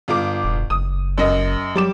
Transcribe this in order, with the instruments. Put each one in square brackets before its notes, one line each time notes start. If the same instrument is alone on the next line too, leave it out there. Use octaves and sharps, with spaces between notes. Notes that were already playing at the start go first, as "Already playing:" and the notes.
[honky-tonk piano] G1 F4 D6
[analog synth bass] E1
[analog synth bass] F#1 [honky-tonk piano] D#6
[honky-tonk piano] F#2 D#5
[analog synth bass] F#3 [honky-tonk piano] G3 D6 E7